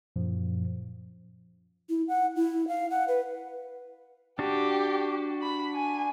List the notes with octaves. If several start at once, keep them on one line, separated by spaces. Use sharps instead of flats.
F#2 A#2 F3
E4
F#5
E4
F5
F#5
B4
D4 F#4 G4
B5
G#5